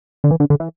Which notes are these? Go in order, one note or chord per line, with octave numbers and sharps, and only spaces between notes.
D3
E3
D3
D3
E3